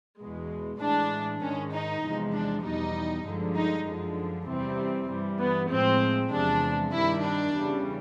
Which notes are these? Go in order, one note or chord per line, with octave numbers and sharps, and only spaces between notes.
E2 B2 G#3
A2 E3 G#3 D4
G#2 D#3 G#3 C#4
D#4
E2 C3 F3 G#3
D4
E2 B2 G3 D#4
G2 D3 F3 G#3
D#4
F#2 D3 F3 G#3
E2 C3 E3 G3 C4
G2 E3 G3
B3
A2 F3 G#3 C4
E2 C3 F3 G#3 D4
G2 D#3 G3 E4
D4
E2 C#3 E3 G3